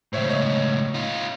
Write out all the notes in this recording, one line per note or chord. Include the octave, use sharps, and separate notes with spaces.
C#2 A2 C5 C#5 E5
C#5 D#5
D#4 F4